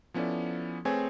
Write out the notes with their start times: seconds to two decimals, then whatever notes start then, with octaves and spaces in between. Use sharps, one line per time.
0.14 F3 B3 C#4 E4 A4 D5
0.85 A3 C4 G#4 B4 C#5 G#5